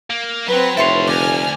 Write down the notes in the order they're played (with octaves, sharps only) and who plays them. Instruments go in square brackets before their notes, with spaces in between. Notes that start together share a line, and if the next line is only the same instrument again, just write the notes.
[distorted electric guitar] A#3
[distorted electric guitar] F#3 [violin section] C4 B4
[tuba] F1 [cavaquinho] E4 C#5 C6 [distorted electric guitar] A4 F5
[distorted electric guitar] D2 [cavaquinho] D5 [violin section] G#5 F6